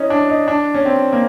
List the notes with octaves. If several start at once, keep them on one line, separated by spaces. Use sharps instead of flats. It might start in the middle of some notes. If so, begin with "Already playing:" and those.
Already playing: C#4 D#4 E4
D4
D#4
D4
C#4
C4
A#3